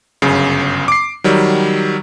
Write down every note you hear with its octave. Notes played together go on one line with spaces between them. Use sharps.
G1 F#2 C#3
D6 C7
D#3 F#3 G3